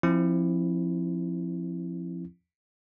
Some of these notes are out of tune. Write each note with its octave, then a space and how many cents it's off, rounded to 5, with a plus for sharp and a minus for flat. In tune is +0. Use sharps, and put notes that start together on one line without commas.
F3 +0 C4 +25 E4 +0